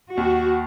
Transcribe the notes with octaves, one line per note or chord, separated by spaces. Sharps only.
D#2 F#4